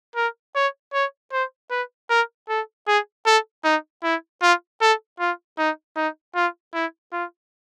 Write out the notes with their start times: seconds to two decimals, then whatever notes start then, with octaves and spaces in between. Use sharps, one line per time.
0.16 A#4
0.56 C#5
0.94 C#5
1.32 C5
1.71 B4
2.10 A#4
2.49 A4
2.87 G#4
3.26 A4
3.64 D#4
4.03 E4
4.42 F4
4.81 A4
5.19 F4
5.58 D#4
5.96 D#4
6.35 F4
6.74 E4
7.13 F4